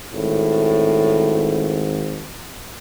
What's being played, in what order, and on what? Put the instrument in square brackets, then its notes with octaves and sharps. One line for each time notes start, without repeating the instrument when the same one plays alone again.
[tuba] G#1 [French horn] A2